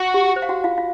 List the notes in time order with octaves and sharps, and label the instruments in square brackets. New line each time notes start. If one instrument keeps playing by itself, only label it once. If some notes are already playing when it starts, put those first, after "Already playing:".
Already playing: [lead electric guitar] F#4
[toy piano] G4
C5
F5
F#4 F#5
F4 F5
F4 F5